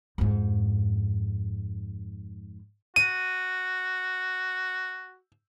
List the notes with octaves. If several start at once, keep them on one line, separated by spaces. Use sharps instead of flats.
F2 G#2
F#4 D#7